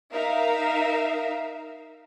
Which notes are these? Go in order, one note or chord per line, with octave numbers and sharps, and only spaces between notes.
D#4 A#4 E5 F5